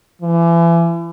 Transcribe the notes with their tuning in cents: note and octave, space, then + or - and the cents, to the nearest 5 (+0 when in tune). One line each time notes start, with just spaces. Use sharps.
E3 +35